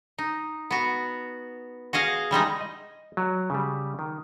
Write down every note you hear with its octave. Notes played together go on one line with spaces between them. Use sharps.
D#4
B3 F#4
F#4 G#4 D#5 F5
E3 G3 G#3 D#4
D#5
F#3
C#3 G3
D#3